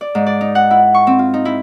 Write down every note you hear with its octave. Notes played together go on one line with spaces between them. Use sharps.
D5
G#2
D5
D#4
F#5
E4
C#6
C4
F4
D#4
E4